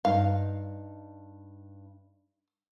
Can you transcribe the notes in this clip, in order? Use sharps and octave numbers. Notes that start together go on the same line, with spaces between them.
G2 D#4 F5